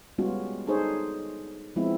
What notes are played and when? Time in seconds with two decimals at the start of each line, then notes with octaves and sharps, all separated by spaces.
0.18 G3 G#3 B3 C#4 F4 F#4
0.67 D4 D#4 G#4 A4 C5 C#5
1.76 F3 G#3 B3 C4 E4